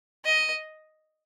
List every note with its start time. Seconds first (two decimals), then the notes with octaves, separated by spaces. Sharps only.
0.25 D#5